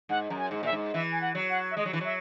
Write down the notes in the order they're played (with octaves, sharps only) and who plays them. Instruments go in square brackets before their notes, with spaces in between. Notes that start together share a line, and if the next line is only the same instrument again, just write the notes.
[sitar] G#2 [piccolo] F#5
[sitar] F#2 [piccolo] A#5
[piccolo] G#5
[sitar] G#2
[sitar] A#2 [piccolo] E5
[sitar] G#2
[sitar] E3 [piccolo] E5
[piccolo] G#5
F#5
[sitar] F#3
[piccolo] F#5
E5
[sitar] G#3 [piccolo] D#5
[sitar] F#3
E3
[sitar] F#3 [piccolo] E5